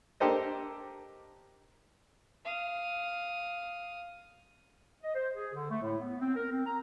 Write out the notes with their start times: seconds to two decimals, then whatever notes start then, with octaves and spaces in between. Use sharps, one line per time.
0.20 A#3 D4 G4 A4 C5 D#5
2.45 F5 D#6
5.03 D#5
5.15 C5
5.35 G#4
5.54 D3
5.70 A3
5.82 A2
6.00 B3
6.21 C4
6.36 A#4
6.51 C4
6.66 A#5